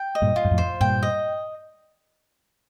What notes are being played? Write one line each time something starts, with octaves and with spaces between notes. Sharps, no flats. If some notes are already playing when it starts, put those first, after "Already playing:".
Already playing: G5
D#5
G2 A#2
F4
G2
F2 A2
C5
G2 A#2 G5
D#5